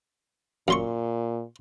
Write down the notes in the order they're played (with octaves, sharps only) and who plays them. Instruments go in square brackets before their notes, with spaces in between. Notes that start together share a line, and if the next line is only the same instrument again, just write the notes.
[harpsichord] F#2 C6 C#6 [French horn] A#2